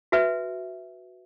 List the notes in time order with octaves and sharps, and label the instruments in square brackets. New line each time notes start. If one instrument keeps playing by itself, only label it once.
[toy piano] F#4 B4 E5 G#5